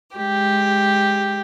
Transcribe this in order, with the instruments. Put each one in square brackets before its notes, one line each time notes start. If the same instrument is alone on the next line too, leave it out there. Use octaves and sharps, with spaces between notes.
[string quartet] G#3 G4